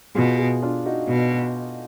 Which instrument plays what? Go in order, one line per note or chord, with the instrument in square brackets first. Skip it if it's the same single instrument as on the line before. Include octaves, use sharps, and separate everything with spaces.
[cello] B2 [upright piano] F4 G#4
[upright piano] F4 G#4
D4 F4
D#4 F#4
[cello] B2